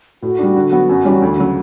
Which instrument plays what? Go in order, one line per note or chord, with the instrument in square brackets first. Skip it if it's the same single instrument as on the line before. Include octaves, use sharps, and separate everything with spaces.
[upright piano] A2 [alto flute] F#4
[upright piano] G3 D4
D3
F#3 B3
F#2
E3 G3 C#4
D2
C#3 F#3